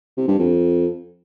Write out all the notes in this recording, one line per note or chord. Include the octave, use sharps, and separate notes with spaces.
C3
G2
F2